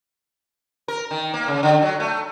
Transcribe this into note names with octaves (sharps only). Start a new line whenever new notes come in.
A#4
D#3
A#3
C#3
D3
F#3
A3